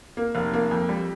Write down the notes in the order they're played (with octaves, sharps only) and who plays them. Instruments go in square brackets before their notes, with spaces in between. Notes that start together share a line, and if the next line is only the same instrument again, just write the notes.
[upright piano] A#3
F1
A#3
F2
G3